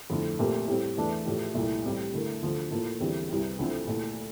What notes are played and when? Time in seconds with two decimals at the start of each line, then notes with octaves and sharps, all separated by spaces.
0.10 F2 D3 A3 E4
0.39 A#2 A3 C4 G4 A#4
0.67 A2 G3 C4
0.97 E2 E3 A3 D4
1.25 A2 F3 A3 E4 G4
1.54 C2 A#2 A3 E4 G4
1.85 A2 G3 C4 G4
2.13 D3 A3 E4 A#4
2.43 D2 D3 F3
2.71 A2 F3 A#3 F4 A4
3.00 E2 D3 G3 C4 E4
3.29 C2 C3 E3 G3
3.59 D2 D3 F3 C4 E4
3.87 A#2 A3 E4